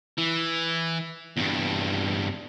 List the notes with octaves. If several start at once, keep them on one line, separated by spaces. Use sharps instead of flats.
E3
E2 G2